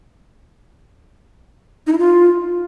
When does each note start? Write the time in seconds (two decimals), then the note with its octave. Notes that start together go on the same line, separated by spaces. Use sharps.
1.87 D#4
1.92 E4
1.98 F4